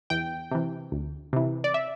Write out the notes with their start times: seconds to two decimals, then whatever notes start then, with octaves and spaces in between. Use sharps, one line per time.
0.10 E2 G5
0.51 C3 E3
0.92 D2
1.33 C3 E3
1.64 D5
1.74 E5